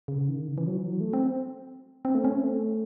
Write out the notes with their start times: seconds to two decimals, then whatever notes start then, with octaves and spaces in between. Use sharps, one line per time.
0.08 C#3
0.29 D#3
0.48 C#3
0.58 E3
0.67 F#3
0.78 E3
0.87 F#3
1.01 A3
1.13 C4
2.05 C4
2.15 A3
2.24 C#4
2.34 C4
2.44 A3